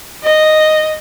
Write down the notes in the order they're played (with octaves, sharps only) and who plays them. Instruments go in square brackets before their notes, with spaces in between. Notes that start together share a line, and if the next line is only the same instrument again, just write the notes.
[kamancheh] D#5